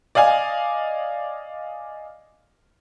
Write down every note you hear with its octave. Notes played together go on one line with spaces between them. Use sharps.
D5 D#5 F5 G#5